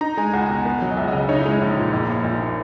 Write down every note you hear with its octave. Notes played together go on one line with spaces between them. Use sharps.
D#4 A#5
G#3 G#5
C#2 F#5
B2
B3
F#3
D#5
C#2 E5
D#5
C#3
D#5
D#4 C#5
E4
G#3
E4
A#1 D#4
A#2
A#1
A#3
A#1
A#2